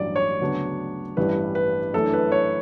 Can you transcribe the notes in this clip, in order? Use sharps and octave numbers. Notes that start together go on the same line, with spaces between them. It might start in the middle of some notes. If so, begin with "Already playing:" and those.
Already playing: A1 G2 F#3 D5
C#5
D2 C#3 F#3 B3 D4
A1 G2 E3 G3 D4 B4
B4
F#2 E3 A3 D4 A4
B4
C#5